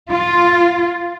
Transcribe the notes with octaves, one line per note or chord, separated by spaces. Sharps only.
F4